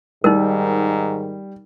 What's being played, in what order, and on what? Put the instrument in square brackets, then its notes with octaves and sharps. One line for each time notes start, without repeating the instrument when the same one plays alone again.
[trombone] G#2 [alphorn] D#3 [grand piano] G3 [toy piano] D#4 A#4